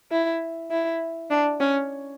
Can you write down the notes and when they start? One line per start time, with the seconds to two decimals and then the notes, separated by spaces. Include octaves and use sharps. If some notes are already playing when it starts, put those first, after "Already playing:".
0.11 E4
0.71 E4
1.30 D4
1.60 C#4